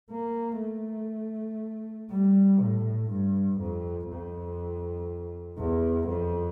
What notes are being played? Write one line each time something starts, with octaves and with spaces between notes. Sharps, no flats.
A#3
A3
G3
A2
G2
F2
F2
E2
F2